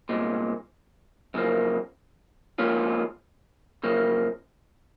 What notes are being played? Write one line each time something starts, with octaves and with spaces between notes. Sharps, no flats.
C2 A#2 G#3
F#2 C#3 F3 A#3
G#2 F3 A#3 C#4 F4
F#2 C#3 F3 A#3